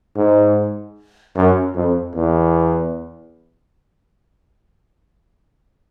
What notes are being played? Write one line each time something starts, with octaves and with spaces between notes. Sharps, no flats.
G#2
F#2
F2
E2